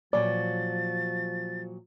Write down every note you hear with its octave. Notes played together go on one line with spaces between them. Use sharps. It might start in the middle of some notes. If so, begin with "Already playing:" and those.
A#2 F3 F#3 D5 A6